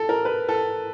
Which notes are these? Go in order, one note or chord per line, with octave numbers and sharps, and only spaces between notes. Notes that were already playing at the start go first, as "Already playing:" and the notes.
Already playing: A4
A#4
B4
A4